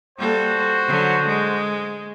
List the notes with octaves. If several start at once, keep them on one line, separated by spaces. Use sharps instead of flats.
G3 A#3 F#4 A4 C5
D3 F#3
G#3